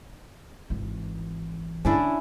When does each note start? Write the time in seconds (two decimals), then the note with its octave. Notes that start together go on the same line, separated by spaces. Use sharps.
0.70 G#1 E3
1.85 D3 C#4 D4 E4